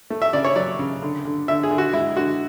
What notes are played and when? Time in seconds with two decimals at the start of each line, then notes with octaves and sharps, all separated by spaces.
0.10 A3
0.22 E5
0.33 C#3 D5
0.45 C#5
0.56 F#3 D5
0.79 C#3
1.02 D3
1.25 D3
1.48 D3 E5
1.63 G#4
1.71 D3
1.78 F#4
1.93 G#3 E4
2.17 D3 F#4